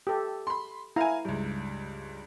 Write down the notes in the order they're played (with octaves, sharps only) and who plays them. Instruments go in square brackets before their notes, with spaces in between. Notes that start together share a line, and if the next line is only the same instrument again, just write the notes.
[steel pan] G4 A4
[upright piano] B5 C6
[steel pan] E4 A#5 [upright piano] F5 G#5
[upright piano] C#2 G2